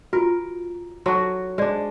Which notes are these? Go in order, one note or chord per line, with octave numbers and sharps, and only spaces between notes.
F4 F#4 A#4
F#3 F#4 A4 A5 C6
G#3 D4 C5 D5